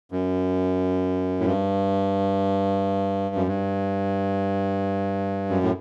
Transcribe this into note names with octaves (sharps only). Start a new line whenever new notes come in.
F#2
A2
G2
F#2
G2
F#2
A2